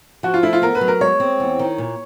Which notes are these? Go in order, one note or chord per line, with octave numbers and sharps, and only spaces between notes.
F3 F#4
F4
A3 E4
F4
B3 A#4
B4
F#3
A#4
G#3 C#5
C4
E2
D#3
A#2